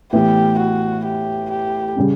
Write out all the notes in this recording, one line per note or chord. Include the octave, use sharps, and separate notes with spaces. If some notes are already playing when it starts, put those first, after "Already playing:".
A2 E3 B3 E4 G4
F#4
G4
G4
C#3 G3 C#4